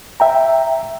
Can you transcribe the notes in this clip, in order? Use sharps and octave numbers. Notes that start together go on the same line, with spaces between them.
E5 G5 A#5